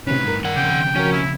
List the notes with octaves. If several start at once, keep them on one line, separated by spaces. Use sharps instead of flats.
A2 C3 D#3 C#4 B4
G2 A#4
D#3 F#5
F2 C#3 G5
F3 C#4 F#4 A#4
E4